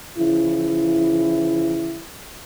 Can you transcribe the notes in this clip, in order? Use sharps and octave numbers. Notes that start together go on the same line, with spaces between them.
C#3 E3 F3 E4